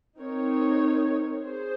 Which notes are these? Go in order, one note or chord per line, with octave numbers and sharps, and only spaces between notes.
C4 D#4 A#4 C#5
G#4 C5